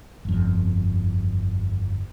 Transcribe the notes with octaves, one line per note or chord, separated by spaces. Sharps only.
G1 F2